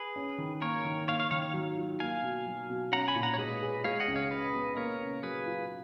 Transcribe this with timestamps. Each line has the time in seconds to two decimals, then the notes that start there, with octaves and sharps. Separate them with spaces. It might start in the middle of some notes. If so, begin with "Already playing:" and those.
Already playing: G#4 B4
0.16 C#4
0.38 D#3
0.61 A#3 A#4 C#5
0.85 D#3
1.08 A#3 C#5 F5
1.19 C#5 F5
1.31 D#3 C#5 F5
1.42 C#5 F5
1.54 F#3
1.77 F4
2.00 A#3 F5 G#5
2.23 B2
2.46 F#3
2.70 B2
2.92 C#4 F#5 A#5
3.08 G#5 B5
3.15 A#2
3.23 F#5 A#5
3.34 C#5
3.38 G#3 B4 D#5
3.62 G#4
3.84 G#3 C#5 F5
4.00 D#5 F#5
4.08 C#2
4.16 C#5 F5
4.31 C#3 B4 D#5
4.54 B3
4.77 A#3 A#4 C#5
5.00 C#3
5.23 F#3 G#4 B4
5.46 F4